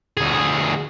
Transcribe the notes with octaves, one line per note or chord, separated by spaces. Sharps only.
D2 G#4